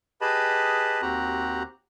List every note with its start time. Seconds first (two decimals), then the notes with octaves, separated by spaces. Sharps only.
0.21 G4 G#4 B4 D#5 A5 B5
1.02 D#2 C4 F#4 G4 A#5 F#6